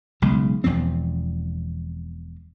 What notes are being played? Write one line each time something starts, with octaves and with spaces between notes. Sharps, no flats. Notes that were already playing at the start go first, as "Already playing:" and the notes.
B1 C#3 G#3
E1 E2 F3 C4